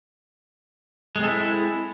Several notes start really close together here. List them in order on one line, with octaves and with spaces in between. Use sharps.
G#3 C4 A4 E4